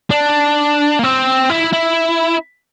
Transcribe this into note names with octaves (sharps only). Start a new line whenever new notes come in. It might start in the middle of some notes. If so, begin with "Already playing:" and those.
D4
A#3
C4
E4
E4